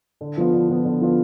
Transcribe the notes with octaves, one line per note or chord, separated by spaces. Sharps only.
D3
F3 B3 F4
D3
F3 B3 F4
D3
F3 B3 F4